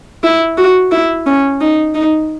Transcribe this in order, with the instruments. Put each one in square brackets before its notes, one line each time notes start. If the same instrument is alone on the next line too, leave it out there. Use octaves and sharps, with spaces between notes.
[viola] E4
F#4
E4
C#4
D#4
D#4